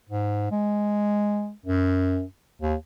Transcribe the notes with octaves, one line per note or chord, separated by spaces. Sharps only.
G#2
G#3
F#2
D#2